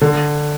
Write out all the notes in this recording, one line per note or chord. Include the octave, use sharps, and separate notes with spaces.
D3